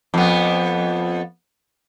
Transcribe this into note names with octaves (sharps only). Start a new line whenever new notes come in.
F2 B3